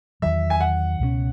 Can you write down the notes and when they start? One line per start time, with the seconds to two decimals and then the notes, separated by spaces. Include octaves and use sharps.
0.22 E2 D#3 F#3 E5
0.50 G#5
0.60 F#5
1.00 C#2 B2 F#3 C#4